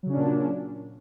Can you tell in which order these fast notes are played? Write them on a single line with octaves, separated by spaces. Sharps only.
F#3 C#3 C#4 D4 A#2